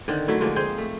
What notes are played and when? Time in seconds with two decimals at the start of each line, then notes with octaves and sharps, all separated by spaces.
0.08 D3 D#3 C4
0.28 F#3 A3 E4
0.41 D3 F3 G#3 A#3
0.56 C4 G#4 C5
0.78 A3